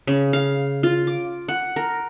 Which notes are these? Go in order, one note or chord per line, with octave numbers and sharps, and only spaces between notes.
C#3
F5
F4
D6
F#5
A#4